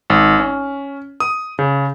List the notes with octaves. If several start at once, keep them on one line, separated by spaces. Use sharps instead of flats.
G#1
C#4
D#6
C#3